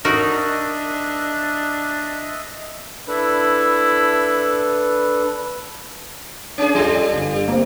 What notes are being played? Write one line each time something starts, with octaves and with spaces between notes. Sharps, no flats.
D4 D#4 F#4 A#4 D#5 E5
D4 E4 A4 B4
C#4 G#4
G3 F4 A4
G1
A#3 C4